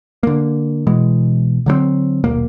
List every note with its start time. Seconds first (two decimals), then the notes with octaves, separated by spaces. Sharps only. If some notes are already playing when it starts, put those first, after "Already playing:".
0.23 D3 A#3
0.87 B2 E3 G#3
1.66 D3 F#3 G3 C4
2.24 D#1 B1 A#3